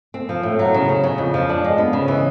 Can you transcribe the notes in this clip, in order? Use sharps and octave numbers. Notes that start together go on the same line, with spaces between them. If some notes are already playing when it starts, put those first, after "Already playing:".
C4
F3
A2
F#3
C#3
C#3
C#3
F2
F3
D4
G#3
B3
C#3
E3